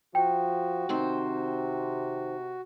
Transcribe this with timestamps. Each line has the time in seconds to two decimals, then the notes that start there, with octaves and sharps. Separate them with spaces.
0.15 F3 F#4 G5
0.89 C3 D#3 C4 C5